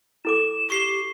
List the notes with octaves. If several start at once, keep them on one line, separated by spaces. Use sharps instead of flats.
E4 A4 D6 E7
G4 C#6 C7 G7